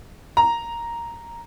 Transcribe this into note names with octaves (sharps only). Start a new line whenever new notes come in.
A#5